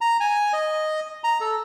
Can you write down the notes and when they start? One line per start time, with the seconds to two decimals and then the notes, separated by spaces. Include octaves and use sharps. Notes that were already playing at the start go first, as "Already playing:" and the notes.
0.01 A#5
0.20 G#5
0.53 D#5
1.24 A#5
1.41 A4